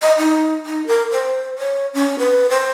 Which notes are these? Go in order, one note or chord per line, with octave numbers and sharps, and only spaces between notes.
D#5
D#4
D#4
A#4
C5
C#5
C#4
B4
C5